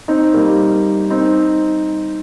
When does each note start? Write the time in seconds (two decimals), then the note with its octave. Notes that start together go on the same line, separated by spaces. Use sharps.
0.08 C4 D#4
0.34 G3 A#3
1.10 C4 D#4